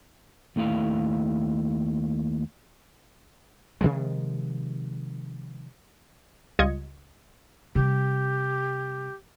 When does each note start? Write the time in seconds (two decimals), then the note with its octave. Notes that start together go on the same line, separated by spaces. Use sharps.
0.56 D#2 A3 E4 F5
3.81 C3 D#3 F3 G#3
6.59 C#2 G3 F4 D#5 G#6 C#7
7.75 C3 G3 G4